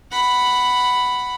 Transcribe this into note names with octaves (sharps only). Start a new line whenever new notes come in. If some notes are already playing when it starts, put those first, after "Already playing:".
F#5 B5